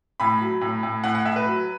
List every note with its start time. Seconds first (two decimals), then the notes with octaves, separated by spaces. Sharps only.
0.20 A2 B5
0.41 F#3
0.61 A2
0.83 A2
1.04 A2 F#5
1.15 F#5
1.25 A2 E5
1.36 B4
1.47 F#3